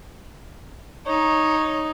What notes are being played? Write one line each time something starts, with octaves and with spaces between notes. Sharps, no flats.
D#4 C#5